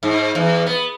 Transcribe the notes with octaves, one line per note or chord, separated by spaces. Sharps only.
G#2
E2
B3